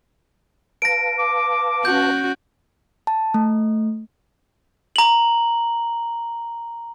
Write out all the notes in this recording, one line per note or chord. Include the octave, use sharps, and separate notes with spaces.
B4 F5 A5 A#6 D7
D6
C#4 F#4 G6
A5
A3
A#5 F#7